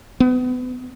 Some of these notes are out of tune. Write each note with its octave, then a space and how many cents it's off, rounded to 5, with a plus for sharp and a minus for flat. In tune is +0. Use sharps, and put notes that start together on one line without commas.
B3 +30